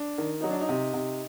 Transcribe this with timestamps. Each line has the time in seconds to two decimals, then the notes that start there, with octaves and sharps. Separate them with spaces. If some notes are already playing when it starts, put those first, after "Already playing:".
Already playing: D4
0.18 D#3
0.41 F#3 D#4
0.50 D4
0.60 D#4
0.69 C3
0.94 C3